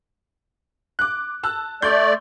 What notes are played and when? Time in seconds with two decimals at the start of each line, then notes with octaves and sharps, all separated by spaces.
0.99 D6 F#6
1.43 A5 E6 F#6
1.82 A3 D5 C6 C#6 G6